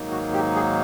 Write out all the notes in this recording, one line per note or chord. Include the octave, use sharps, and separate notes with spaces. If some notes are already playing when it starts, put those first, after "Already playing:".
Already playing: G#2 D#3 F#3 A#3 D#4
F#4
G4
G#4